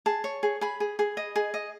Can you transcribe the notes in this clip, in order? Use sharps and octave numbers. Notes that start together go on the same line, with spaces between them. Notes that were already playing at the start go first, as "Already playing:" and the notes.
G#4 A5
C#5
G#4
G#4 B5
G#4
G#4
D#5
G#4
D#5